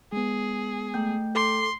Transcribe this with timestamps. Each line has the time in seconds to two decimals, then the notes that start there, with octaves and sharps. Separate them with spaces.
0.13 G#3 B3 G#4
0.94 A3 G5 G6
1.35 A4 C6 D6